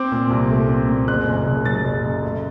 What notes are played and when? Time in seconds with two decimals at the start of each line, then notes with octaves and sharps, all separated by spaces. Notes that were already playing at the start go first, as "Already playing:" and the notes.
Already playing: C4 D6
0.12 A#2
0.30 C2
0.50 A3
0.69 C4
0.88 A#2
1.08 F#1 F#6
1.27 F#2
1.46 F#1
1.65 F#3 A6
1.85 F#1
2.04 F#2
2.23 A3